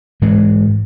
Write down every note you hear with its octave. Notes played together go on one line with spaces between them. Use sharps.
G#2 E3 G#3